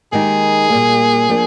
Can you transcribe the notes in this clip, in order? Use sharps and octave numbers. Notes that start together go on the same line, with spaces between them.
D#2 D#3 G#3 D#4 G4 G#4
A#2 G3 A#3
F3 A#3 D4